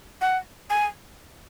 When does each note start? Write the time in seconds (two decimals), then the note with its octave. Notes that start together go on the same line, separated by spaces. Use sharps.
0.21 F#5
0.70 G#5